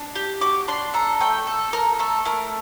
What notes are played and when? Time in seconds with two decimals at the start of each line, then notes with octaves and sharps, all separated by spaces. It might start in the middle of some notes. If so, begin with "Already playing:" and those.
Already playing: D4
0.15 G4
0.41 F#4 D6
0.68 D4 C6
0.94 A4 A#5
1.20 A3 G5
1.47 A4
1.73 A4 A#4
1.99 A3 A4
2.25 A3 A#4